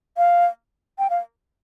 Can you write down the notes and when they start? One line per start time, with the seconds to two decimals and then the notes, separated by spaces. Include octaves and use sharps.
0.17 F5
0.99 G5
1.10 F5